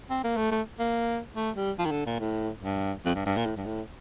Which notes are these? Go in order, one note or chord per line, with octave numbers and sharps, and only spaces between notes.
C4
A#3
A3
A3
A#3
A3
G3
F3
D#3
D3
A#2
A2
G2
F2
G2
G2
A#2
A2
G2
A2